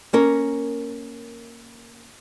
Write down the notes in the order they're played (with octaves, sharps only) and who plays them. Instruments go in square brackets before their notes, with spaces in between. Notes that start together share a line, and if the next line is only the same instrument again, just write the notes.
[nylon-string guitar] A#3 C#4 A#4